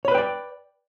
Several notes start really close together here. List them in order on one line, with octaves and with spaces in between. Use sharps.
C#5 B5 B4 G5 D5